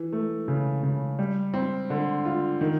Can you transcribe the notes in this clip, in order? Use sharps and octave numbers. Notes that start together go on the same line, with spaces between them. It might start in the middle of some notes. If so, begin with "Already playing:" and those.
Already playing: E3
A3
C#3
C#3
G3
C4
D3
F4
D#3